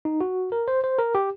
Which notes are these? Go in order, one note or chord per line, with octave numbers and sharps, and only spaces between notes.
D#4
F#4
A#4
C5
C5
A#4
G4